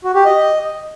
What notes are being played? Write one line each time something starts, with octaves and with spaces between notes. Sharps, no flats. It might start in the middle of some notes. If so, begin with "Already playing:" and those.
F#4
G4
D#5